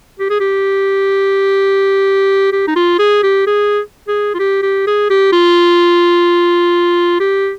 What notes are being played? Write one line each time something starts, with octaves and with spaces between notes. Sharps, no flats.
G4
G#4
G4
G4
D#4
F4
G#4
G4
G#4
G#4
F4
G4
G4
G#4
G4
F4
G4